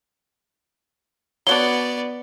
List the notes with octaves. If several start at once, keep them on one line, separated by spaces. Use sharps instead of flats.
B3 D4 F#4 C#5 D5 G7